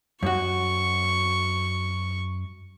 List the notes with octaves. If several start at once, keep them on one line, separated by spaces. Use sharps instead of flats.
F#2 F#4 C#6